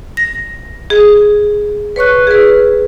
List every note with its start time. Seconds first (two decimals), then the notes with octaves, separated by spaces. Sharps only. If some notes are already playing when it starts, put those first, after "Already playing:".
0.17 A#6
0.90 G#4
1.96 B4 C#5 C#6 F#6
2.27 G#4 B4